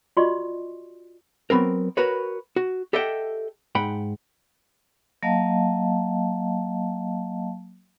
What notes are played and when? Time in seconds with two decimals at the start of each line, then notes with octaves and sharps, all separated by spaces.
0.17 F4 F#4 D5 D#5 C6 C#6
1.50 F#3 B3 C4 A#4
1.97 F#4 A#4 B4 C#5
2.56 F#4
2.93 G4 A4 D#5 E5 F#5 G5
3.75 G#2 F#5 G5 B5
5.23 F#3 A#3 D#5 F5 A5